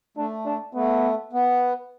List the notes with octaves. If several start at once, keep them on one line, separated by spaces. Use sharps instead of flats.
A3 D4
D4
A3 B3
B3